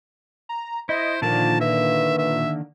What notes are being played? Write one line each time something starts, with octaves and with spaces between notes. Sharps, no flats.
A#5
E4 C5 D#5
A#2 D3 D#3 F3 A#3 A5
B4 E5
E5